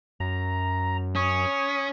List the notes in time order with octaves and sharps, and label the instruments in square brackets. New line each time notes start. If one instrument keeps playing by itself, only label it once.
[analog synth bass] F#2 [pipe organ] A#5
[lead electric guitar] C#4 [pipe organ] C#6 D#6